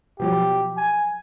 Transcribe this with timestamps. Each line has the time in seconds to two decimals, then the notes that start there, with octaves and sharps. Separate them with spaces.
0.20 B2 F3 F#3 G4
0.77 G#5